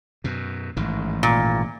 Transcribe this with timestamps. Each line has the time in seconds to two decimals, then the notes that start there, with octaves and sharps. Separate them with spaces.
0.24 F#2 B2
0.77 A1 G#2 D#3
1.23 A#2